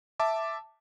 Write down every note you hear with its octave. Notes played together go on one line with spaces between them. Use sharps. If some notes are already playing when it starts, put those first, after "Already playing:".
E5 A5 D6